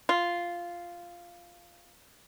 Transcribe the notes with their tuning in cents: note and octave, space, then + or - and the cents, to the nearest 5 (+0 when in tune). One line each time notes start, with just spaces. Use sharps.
F4 -5